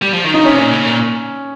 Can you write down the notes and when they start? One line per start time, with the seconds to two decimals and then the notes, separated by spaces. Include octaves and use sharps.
0.02 G3
0.13 F3
0.24 D#3
0.34 C#3 D#4
0.45 C3 C#4
0.58 A#2
0.71 C#3
0.85 A#2